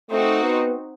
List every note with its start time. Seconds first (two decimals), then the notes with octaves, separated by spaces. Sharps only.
0.11 A3 C4 D#4 F#4
0.43 B3